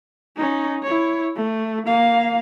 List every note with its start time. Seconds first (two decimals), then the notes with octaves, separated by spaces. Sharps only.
0.37 C#4 D#4
0.83 E4 C#5
1.36 A3
1.87 A#3 F5